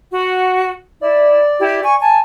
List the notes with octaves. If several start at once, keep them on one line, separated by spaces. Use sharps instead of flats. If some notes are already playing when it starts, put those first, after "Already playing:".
F#4
E4 D5
E4 G4
G#5 C#6
G#5 A5